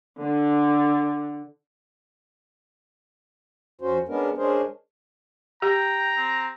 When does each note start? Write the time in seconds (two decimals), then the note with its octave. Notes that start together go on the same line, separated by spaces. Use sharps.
0.21 D3
3.81 F2 C#4 F#4 C5
4.08 G#3 B3 C#4 D4 A#4
4.37 G#3 C#4 D4 G#4 A#4 C5
5.62 G4 G5 A#5
6.17 C4